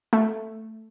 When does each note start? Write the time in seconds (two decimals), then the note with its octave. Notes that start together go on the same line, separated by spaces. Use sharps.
0.13 A3